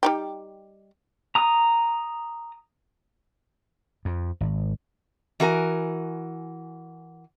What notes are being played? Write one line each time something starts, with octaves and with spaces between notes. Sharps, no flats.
G3 D#4 G4
A#5 D#6
F2
G#1
E3 F#4 A#4 G#5